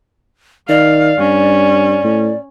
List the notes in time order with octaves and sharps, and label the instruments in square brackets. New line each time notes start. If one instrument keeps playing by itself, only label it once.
[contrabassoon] D#3 [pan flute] D5 [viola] F5
[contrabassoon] G2 [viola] C#4
[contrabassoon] A2